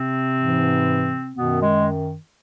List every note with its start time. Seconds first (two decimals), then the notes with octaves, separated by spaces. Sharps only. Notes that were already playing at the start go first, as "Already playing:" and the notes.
Already playing: C3 C4
0.37 G#2 E3
1.36 F#2 B2 D#3 B3
1.60 G#3